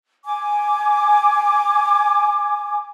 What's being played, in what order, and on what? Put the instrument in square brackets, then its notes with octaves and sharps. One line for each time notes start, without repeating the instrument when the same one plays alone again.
[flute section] G#5 D6